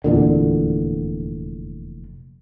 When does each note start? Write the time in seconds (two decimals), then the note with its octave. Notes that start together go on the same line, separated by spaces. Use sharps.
0.04 F1 E2 A#2 D3